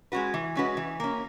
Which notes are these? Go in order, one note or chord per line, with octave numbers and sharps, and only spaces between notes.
G#3 C#4 F#4 B4
E3
G#3 C#4 F#4 B4
E3
A#3 C#4